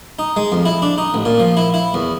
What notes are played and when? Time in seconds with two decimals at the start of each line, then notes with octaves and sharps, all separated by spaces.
0.19 D#4
0.37 G#3
0.52 F2
0.65 E4
0.82 D4
0.98 D#4
1.14 A1
1.25 A#2
1.40 F3
1.57 E4
1.74 E4
1.94 E2